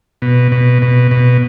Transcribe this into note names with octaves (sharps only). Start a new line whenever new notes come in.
B2
B2
B2
B2